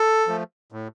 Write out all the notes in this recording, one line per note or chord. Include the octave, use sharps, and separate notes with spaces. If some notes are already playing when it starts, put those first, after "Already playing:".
Already playing: A4
F3 A3
A2